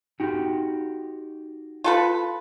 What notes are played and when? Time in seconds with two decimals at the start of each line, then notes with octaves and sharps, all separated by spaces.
0.20 D#4 F#4 G4
1.84 F4 A4 B4